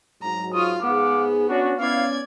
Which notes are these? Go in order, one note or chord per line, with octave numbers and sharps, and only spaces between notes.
G#2 F#3 A#5
F4 F5 C#6 D#6
G#2 B3 G#4 F5 F#5 D6
C#4 D4 F#4
B3 C#4 E4 D5 F5 G#6